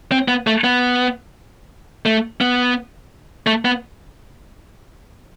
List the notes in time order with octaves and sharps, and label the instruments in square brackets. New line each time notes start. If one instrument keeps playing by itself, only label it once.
[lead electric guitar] C4
B3
A3
B3
A3
B3
A3
B3